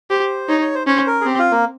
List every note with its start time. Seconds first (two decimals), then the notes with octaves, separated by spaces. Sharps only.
0.10 G4 C5
0.49 D#4 C#5
0.61 C#5
0.75 C5
0.87 C#4 C5
1.07 A#4
1.21 G#4
1.25 C4 G4
1.39 F4
1.51 A#3